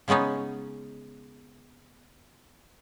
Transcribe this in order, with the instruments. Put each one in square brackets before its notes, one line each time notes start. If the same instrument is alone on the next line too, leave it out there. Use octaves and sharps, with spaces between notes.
[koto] C#3 G#3 B3 C#4 D#4